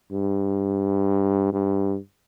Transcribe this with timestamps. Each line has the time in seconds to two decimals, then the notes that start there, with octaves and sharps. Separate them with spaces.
0.12 G2
1.53 G2